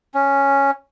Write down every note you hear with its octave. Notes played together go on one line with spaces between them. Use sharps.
C#4